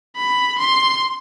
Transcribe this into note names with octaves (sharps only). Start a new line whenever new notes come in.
B5
C6